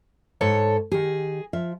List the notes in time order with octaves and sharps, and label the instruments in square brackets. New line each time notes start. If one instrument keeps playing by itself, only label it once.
[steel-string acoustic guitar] G#2 A4 C#5
[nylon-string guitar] D#3 G4 [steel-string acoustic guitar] G#4
[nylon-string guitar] F3 F4 E5